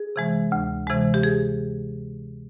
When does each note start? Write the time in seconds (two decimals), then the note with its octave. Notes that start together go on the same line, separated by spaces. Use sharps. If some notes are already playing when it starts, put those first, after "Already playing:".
Already playing: G#4
0.16 C3 E3 G#3
0.52 D2
0.87 C3 E3 G#3
1.14 G4
1.23 G#4